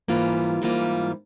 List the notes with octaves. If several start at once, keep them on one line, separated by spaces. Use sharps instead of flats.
G#2 E3 G3 A#3 F4
G#2 E3 G3 A#3 F4